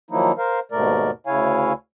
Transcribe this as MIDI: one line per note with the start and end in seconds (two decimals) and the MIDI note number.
0.11 0.32 51
0.11 0.32 53
0.11 0.32 54
0.11 0.32 58
0.11 0.32 63
0.11 0.32 64
0.38 0.60 70
0.38 0.60 72
0.38 0.60 77
0.72 1.11 39
0.72 1.11 44
0.72 1.11 47
0.72 1.11 57
0.72 1.11 70
0.72 1.11 74
1.27 1.73 38
1.27 1.73 49
1.27 1.73 64
1.27 1.73 73
1.27 1.73 77
1.27 1.73 80